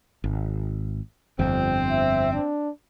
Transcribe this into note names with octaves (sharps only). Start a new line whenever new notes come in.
G#1
G1 F2 C4
E5
D4